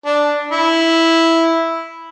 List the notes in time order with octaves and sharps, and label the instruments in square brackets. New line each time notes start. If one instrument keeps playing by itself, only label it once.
[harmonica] D4
E4